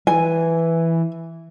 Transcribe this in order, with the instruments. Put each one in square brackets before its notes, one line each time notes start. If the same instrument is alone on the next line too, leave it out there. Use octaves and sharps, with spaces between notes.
[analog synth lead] E3 [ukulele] G#5